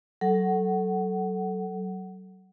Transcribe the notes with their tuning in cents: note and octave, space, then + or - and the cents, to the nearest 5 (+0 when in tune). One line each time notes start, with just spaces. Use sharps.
F#3 +25 A4 +0 F#5 +15